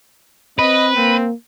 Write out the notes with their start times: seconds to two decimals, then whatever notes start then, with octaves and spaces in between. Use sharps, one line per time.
0.59 C4 B4 D#5
0.96 A#3 C4